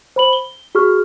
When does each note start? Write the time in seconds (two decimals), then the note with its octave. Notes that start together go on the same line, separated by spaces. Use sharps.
0.16 C5 B5 F#7
0.33 G7
0.75 F#4 G#4 C#6 F6